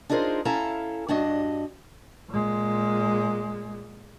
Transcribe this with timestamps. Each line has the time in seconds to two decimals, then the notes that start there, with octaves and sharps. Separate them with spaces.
0.10 D4 D#4 F4 G#4 A#4 C5
0.45 C#4 E4 A4 F5 A5 A#5
1.08 G2 D4 F#4 D#5
2.30 A#2 G#3